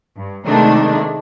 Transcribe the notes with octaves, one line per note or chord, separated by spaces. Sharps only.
G2
C3 D#3 G#3 A3 D4